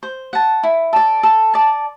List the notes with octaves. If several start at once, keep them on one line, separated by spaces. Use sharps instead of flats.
C5
F#5 A5
E4
A4 D5
A4
D5 A5